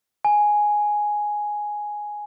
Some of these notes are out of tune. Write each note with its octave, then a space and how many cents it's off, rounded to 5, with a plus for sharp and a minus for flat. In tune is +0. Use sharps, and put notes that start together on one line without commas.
G#5 +5